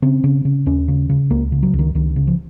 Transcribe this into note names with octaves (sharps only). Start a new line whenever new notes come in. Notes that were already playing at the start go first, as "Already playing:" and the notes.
C#3 C4
C#3
C#3
D#2 C#4
C#3
C#3
C#2 A#3
C#3
F#3
C#2
D#3
C#2 D#3
C#3
F3